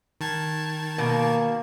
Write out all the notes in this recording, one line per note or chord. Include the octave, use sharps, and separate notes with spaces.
D#3 A5 G#6
B2 A#3